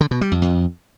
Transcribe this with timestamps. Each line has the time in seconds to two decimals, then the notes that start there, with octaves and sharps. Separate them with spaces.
0.01 D3
0.11 B2
0.21 G3
0.32 F2
0.42 F2